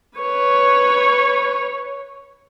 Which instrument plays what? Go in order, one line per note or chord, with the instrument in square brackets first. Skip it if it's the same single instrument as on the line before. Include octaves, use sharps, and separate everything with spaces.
[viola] B4 C#5